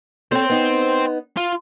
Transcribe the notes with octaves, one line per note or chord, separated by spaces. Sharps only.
C4 A4 C5 C#5 G5
B3 D#4
F4